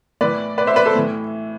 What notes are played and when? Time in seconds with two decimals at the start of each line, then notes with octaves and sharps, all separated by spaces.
0.21 A2 E3 B4 D5
0.58 B4 D5
0.67 C5 E5
0.76 B4 D5
0.85 A4 C5
0.95 A2 E3